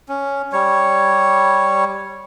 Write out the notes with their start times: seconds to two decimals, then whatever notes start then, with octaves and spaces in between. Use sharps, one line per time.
0.09 C#4
0.52 G3 C#5